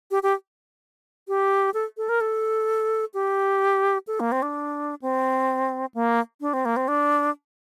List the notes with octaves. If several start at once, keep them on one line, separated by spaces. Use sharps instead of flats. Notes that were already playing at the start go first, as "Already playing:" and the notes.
G4
G4
G4
A4
A4
A#4
A4
G4
A4
A#3
C4
D4
C4
A#3
D4
C4
A#3
C4
D4